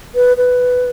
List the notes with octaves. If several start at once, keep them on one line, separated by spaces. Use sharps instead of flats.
B4
B4